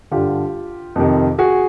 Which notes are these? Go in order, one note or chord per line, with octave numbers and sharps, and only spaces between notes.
G2 D3 F4 G4
F2 C3 D#3
F#4 G#4